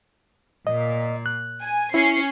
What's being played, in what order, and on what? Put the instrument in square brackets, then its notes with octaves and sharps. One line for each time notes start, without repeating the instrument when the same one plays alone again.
[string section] A#2 [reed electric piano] D#5
[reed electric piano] F#6
[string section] G#5
[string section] C#4 C7 [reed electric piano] E4